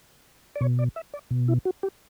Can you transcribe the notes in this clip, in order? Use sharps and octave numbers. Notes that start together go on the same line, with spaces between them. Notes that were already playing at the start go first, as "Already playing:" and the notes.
D5
B2 C#5
D5
E5
D5
B2
E4
F#4
G4